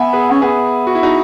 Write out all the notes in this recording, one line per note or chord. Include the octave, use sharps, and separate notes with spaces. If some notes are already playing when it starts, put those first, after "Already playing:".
Already playing: B3 E5 G#5
G#4 B4
C#4
B3 G#4 B4
F#4
E4
D#4 F#4